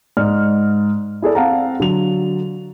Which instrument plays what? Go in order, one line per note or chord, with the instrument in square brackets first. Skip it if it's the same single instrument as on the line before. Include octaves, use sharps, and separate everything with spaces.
[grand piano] G#2 D5 F6
E4 G#4 A4 D5
C4 F5 F#5 A5 A#5
D3 F#3 F7